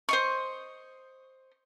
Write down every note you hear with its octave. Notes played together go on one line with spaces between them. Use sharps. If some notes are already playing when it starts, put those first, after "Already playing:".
C5 D#5 C#6